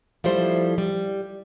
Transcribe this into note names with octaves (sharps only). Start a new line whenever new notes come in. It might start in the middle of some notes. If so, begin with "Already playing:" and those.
F3 G3 A3 E4 C5
G3